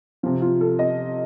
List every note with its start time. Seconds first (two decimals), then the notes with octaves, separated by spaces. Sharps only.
0.23 C3 F3 F4
0.41 F4
0.61 A4
0.79 D#5